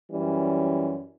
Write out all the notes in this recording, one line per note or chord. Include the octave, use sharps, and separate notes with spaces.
F#2 E3 G3 C#4